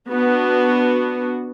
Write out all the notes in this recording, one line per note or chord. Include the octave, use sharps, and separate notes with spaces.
B3 D4 F#4